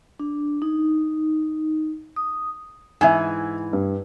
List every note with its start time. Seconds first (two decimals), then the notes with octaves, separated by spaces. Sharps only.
0.19 D4
0.62 D#4
2.16 D#6
3.01 G#2 E3 E5 G#5
3.73 G2